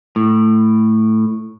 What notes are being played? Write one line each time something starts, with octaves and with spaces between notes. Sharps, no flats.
A2